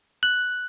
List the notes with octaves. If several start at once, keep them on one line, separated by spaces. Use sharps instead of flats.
F#6